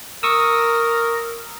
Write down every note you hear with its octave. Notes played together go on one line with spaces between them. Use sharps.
A#4 C#6 D#6 E6